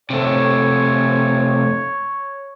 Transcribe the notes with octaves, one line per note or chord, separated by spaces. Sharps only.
C3 A3 C#5